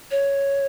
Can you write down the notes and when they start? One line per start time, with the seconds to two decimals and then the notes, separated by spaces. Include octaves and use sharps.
0.11 C#5